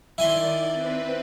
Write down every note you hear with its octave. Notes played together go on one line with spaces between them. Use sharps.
D#3 E4 D5 G#5 C6
C4 B4